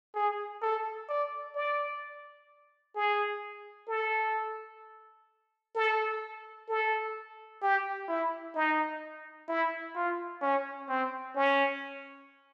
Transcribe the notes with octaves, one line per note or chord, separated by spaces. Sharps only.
G#4
A4
D5
D5
G#4
A4
A4
A4
G4
E4
D#4
E4
F4
C#4
C4
C#4